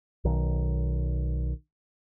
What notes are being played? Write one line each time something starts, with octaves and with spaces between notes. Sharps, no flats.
B1 D#3